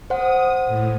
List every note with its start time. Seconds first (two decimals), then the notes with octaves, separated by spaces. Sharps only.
0.10 C5 F#5 D#6
0.67 A2